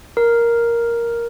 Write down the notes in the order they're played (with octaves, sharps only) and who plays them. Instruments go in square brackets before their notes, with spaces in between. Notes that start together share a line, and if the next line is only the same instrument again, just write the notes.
[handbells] A#4